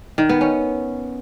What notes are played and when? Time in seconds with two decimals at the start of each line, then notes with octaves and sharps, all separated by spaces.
0.18 D#3
0.29 B3
0.41 C#4